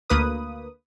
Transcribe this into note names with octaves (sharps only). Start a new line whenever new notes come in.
D2 A#3 B4 D#6